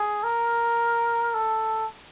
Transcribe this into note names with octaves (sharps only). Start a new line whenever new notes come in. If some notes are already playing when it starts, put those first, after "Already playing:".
Already playing: G#4
A#4
A4